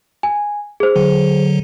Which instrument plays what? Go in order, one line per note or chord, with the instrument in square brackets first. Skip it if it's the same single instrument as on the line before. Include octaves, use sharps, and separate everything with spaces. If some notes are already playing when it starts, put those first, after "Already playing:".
[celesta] G#5
G#4 C5
[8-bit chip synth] D3 F#3